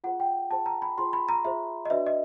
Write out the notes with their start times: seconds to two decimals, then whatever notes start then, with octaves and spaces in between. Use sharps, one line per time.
0.04 F4 G#4 C5 F#5
0.20 G5
0.51 F4 G#4 C5 A5
0.66 A#5
0.82 B5
0.98 F4 G#4 C5 C6
1.13 B5
1.29 A#5
1.45 F4 G#4 C5 E5
1.85 D#5
1.90 D4 F#4 B4 D5 E5
2.06 D#5